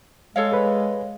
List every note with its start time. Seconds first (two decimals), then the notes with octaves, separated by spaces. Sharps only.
0.36 G#3 A4 C#5 F5
0.52 G#4 B4